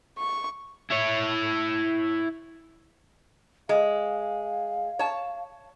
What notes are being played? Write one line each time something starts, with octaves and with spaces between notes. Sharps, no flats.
C#6
E4 C#5
G#3 F5
C#5 A5